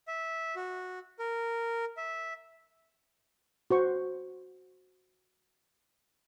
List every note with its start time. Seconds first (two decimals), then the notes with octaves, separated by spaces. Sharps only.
0.08 E5
0.56 F#4
1.19 A#4
1.97 E5
3.71 F#4 C5 C#6